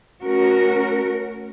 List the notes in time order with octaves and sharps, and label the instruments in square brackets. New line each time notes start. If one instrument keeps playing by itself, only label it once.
[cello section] A3 C#4 F#4 A#4